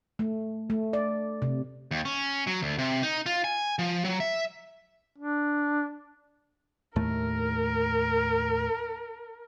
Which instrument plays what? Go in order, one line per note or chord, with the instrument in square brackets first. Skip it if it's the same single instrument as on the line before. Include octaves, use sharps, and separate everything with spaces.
[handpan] A3
A3
D5
C3
[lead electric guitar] D#2
C#4
F#3
D2
C3
D#4
F4
G#5
F3
F#3
E5
[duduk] D4
[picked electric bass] D#2 A2 A3 [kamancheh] A#4